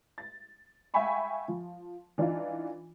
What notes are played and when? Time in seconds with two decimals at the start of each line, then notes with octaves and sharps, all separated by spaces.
0.18 A6
0.94 E5 F5 G5 G#5 B5 C#6
1.48 F3
2.18 E3 D4 D#4 F4